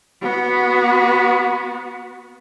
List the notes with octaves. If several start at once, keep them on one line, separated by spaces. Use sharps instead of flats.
B3 F#4